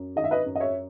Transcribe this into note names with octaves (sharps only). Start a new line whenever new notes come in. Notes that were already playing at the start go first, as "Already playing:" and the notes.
Already playing: F#2
D#3 D#5
E5
B4 D#5
F#2
D#5
C#5 E5